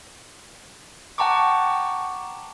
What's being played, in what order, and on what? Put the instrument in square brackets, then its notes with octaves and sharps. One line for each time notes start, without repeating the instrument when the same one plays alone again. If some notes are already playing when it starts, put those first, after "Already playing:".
[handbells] F#5 G5 A5 A#5 C#6 D6